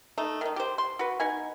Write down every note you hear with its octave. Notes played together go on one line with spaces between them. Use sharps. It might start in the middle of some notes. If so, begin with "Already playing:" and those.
A3 D#4
D#3 D#4
G4 C5
C6
F#4 B4
B3 D#4 G#5